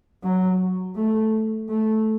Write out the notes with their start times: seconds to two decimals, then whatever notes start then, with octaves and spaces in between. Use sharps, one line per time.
0.23 F#3
0.96 A3
1.69 A3